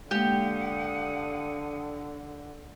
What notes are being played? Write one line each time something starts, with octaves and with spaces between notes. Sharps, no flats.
D3 G#3 A#3 G4 F5 F#5 D#6